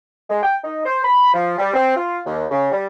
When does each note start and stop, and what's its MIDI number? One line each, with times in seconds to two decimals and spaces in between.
0.29 0.41 56
0.42 0.56 79
0.63 0.83 63
0.85 0.99 72
1.03 1.33 83
1.33 1.56 53
1.58 1.73 55
1.74 1.91 60
1.95 2.19 65
2.26 2.45 39
2.50 2.70 49
2.72 2.86 55